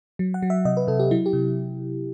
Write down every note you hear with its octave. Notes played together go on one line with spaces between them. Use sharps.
F#3
F#5
F#3
E5
C3 D#5
B4
C3 A4
G4
F#3 E4
G4
C3